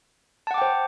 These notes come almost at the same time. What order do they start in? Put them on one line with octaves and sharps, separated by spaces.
A5 F#5 D6 G5 C5